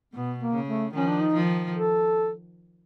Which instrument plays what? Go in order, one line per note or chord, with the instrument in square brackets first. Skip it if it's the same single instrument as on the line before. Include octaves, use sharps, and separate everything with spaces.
[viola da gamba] B2 [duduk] B3
[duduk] A#3
[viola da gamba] C#3
[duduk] A3
[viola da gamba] D#3 F3 [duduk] C#4
[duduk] D4
D#4
[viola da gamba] D#3 F3
[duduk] A4